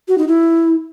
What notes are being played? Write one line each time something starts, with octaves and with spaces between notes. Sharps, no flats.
F#4
D#4
E4